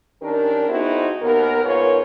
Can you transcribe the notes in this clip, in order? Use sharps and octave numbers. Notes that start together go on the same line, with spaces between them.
D#3 C#4 D4 G4 A#4
B3 C4 D#4 E4 F#4 G#4
D#2 B3 A#4
G#2 B3 F4 A#4 C#5